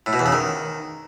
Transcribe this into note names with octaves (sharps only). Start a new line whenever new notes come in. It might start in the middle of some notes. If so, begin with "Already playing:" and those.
A2
B2
E2
C#3
D#3